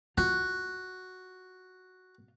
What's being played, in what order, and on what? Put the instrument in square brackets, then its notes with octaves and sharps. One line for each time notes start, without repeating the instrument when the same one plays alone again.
[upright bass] F4 [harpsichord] F#4